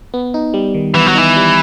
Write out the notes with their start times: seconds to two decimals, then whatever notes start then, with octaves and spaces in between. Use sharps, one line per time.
0.14 B3
0.34 D#4
0.54 G3
0.74 D#3
0.94 E3 B3
1.06 F#3
1.15 E3 D#4
1.36 G3